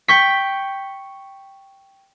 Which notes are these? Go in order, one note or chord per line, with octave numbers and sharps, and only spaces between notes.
G5 C#6 B6